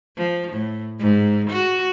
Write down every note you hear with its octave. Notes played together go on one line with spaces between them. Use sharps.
F3
A2
G#2
F#4